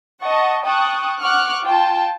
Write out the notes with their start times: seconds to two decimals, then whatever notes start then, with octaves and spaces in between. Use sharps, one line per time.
0.22 D#5 F#5 A5 C#6
0.64 G5 A5 C#6 D#6 F#6
1.21 F#5 C#6 D6 F6 F#6
1.64 F4 G5 A5